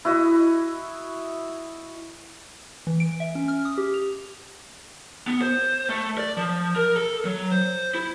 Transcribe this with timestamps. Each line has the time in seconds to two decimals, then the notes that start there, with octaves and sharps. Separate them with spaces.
0.05 E4 F#4 D#5
2.87 E3
3.00 D7
3.20 E5
3.35 C#4
3.48 F6
3.65 D#6
3.78 G4
3.94 F7
5.28 B3
5.41 C5
5.89 A3
6.18 D5
6.37 F3
6.76 A#4
6.97 A4
7.25 F#3
7.52 C5
7.95 E4